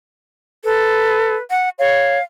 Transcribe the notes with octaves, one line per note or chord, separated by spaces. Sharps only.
A4 B4
F#5
C#5 F5